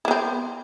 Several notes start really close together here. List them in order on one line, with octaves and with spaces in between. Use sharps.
E4 B3 C4